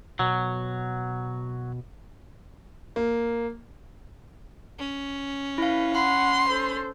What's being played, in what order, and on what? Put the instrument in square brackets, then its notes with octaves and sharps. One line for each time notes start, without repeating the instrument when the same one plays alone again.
[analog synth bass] B2 [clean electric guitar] F#3
[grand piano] A#3
[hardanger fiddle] C#4
[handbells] E4 F5 [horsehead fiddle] B4
[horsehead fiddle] F#5 [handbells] B5 [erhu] C6
[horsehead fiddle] A4 C5